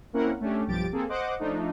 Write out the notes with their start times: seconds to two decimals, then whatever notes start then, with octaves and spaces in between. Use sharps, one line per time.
0.13 A#3 C4 C#4 E4 A#4 F#5
0.40 A3 C#4 D4 G4
0.67 B1 G2 F3 G4 A6 D7
0.92 A#3 C4 G#4 A4
1.09 C5 D#5 F#5 D6
1.39 F3 A3 D4 D#4